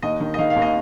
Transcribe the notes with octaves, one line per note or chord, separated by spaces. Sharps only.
D#2 D#5
D#3
D#5
D#3 F5
F5
D#2
D#5